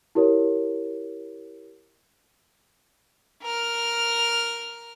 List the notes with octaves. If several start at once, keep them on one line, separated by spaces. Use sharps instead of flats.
E4 G4 A#4 C#5
A#4 F6